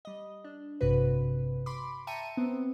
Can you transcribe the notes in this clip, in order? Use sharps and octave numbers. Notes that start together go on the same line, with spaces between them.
G3 D#5
D4
A1 G2 C3 F#4 B4
B5 C6 D6
E5 G5 A5 A#5 C#7 D#7
B3 C4